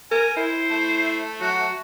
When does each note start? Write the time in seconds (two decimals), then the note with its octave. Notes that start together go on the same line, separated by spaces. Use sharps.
0.11 A#4 G#5
0.36 E4 C5
0.70 A3
1.41 F#3 F#4